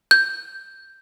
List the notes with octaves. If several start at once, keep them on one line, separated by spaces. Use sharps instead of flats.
G6